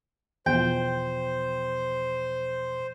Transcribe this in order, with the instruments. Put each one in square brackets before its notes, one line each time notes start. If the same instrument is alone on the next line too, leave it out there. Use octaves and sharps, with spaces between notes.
[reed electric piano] E2 B2 F3 [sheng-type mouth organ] C5 [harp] G5